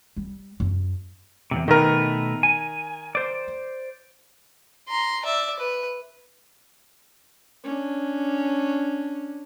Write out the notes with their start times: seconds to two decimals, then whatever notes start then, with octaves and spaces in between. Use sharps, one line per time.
0.16 G3
0.60 F#2
1.51 E2 G#2 C3
1.68 B2 D#3 A3 A#4 B4
2.43 G#5
3.15 C5 D5
4.88 A#5 C6
5.25 D5 E5
5.59 B4
7.64 C#4 D4